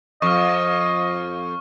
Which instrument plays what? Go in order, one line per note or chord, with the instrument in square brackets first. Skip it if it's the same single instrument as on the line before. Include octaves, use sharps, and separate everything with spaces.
[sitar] F2 [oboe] D#5 [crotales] C#6 F6